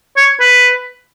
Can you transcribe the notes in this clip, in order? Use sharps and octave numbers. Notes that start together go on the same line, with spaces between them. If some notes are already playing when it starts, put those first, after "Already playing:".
C#5
B4